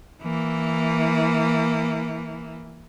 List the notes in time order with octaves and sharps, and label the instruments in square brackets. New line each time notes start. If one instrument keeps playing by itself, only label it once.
[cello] E3 A#3